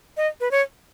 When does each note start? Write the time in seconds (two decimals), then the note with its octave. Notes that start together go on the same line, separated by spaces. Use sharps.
0.17 D#5
0.40 B4
0.51 C#5